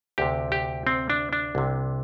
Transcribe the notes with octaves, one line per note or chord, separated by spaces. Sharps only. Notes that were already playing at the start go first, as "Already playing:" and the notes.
D2 C3 G4
G4
C4
D4
D4
C2 C3